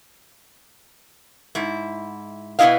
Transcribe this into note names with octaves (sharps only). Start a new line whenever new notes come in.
G#2 E4
B2 B3 D#4 E4 D#5 F5